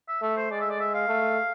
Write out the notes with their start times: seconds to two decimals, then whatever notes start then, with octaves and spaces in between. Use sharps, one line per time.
0.09 E5
0.22 A3 E5
0.37 C5
0.51 G#3 D5
0.61 E5
0.71 D5
0.80 E5
0.94 F5
1.08 A3